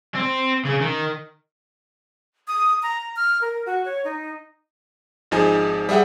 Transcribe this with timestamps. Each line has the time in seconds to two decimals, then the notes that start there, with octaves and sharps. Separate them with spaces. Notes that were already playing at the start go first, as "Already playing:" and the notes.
0.15 C4
0.65 C#3
0.81 D#3
2.48 D#6
2.83 A#5
3.16 F6
3.41 A#4
3.66 F#4
3.85 C#5
4.05 D#4
5.31 G#1 F3 D#4 G#4 G#5
5.89 G3 G#4 E5 F#5 G5